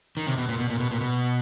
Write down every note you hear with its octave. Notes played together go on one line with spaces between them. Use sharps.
D#3
C3
B2
A#2
B2
A#2
B2
A#2
B2